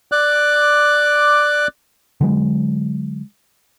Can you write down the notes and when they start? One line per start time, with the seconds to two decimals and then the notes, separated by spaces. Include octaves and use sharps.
0.12 D5 D6 F#6
2.21 D3 F#3 G#3